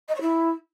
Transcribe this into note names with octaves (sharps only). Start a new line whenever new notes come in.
D#5
C#5
E4